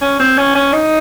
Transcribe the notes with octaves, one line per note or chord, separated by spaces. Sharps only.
C#4
C4
C#4
C#4
D#4